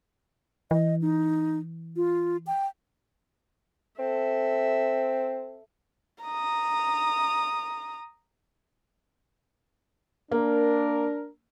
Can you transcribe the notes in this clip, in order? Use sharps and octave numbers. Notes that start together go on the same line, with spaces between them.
E3 D#5
D#4
F4
G5
C4 A4 E5
A#5 D#6
A#3 D4 A#4